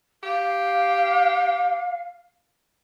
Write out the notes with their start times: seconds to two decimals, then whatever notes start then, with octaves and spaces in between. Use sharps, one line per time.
0.23 G4 F5